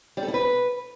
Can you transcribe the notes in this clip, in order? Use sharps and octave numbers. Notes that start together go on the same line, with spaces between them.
G3
A4
E4
B4